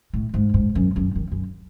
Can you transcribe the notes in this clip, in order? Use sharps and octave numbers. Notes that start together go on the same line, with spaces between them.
A2
G#2
G#2
F#2
F#2
D#3
F#2